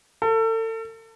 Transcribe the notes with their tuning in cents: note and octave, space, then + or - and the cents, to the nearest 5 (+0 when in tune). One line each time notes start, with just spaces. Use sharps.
A4 +35